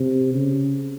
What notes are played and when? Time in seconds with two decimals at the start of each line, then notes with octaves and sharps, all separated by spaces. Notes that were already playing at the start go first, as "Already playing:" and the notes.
Already playing: C3
0.33 C#3